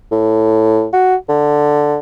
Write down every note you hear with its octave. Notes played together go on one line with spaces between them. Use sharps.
A2
F#4
D3